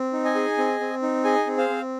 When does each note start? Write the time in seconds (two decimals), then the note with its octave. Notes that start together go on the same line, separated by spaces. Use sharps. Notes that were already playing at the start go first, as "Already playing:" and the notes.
Already playing: C4
0.13 D#4
0.24 D#5 G#5
0.35 G#4
0.58 C4
0.80 C4
1.02 D#4
1.24 G#4 D#5 G#5
1.47 C4
1.58 C5 F5
1.70 C4